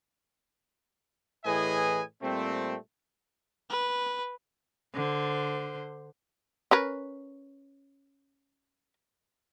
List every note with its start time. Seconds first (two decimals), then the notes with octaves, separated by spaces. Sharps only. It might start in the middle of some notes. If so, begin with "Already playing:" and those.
1.45 A2 E3 G#4 B4 D#5 G#5
2.22 A#2 G3 A3 C4
3.70 B4
4.94 D3 C5
6.71 C#4 A#4 B4